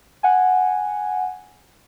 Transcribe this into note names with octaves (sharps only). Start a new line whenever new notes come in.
F#5 G#5